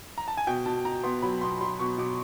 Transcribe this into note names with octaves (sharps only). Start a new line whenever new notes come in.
A#5
A5
G#5
B2 G5
B2 A5
B2 A#5
B3 C6
F#3 B5
B2 C6
F#3 C6
B2 C#6
B2 D6